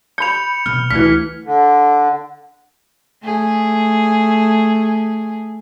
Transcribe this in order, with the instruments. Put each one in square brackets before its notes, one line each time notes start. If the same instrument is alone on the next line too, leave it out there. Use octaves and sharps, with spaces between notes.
[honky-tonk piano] B5 G6 [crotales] C#7 F7
[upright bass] B2 [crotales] F6
[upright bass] D2 [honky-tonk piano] E3 F6 [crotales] B6
[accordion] D3
[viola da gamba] A3 G#4